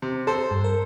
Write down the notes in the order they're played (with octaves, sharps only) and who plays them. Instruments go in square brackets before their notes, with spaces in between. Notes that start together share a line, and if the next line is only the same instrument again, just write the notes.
[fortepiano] C3
A4 C5
[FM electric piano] G2
A#4